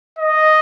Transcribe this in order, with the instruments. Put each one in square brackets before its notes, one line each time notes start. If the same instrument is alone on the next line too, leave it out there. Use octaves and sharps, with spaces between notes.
[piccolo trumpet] D#5